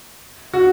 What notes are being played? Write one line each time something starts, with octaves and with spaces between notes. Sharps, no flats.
F#4